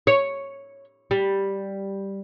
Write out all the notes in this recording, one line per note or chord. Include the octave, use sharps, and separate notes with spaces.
C#5
G3